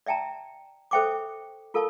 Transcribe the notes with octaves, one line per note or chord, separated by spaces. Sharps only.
D5 E5 G5 A5 A#5
A4 C5 E5 G5 C#6 D6
F4 A4 A#4 F5 A5 C#6